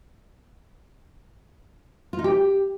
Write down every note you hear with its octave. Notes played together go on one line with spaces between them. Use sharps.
F4
D#4
G4